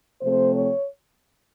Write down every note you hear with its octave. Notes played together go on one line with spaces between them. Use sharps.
C3 F3 A3 C4 C5
C#5